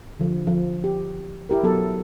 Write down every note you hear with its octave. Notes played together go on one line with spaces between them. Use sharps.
D3 F3
F3
G4
E4 G4 A#4
F#3 B3 A4